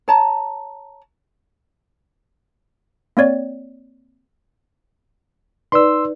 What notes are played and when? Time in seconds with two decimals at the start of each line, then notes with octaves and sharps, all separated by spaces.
0.08 C#5 A5 A#5
3.17 A#3 C4 C#5 D5
5.72 D#4 B4 D5 C6 E6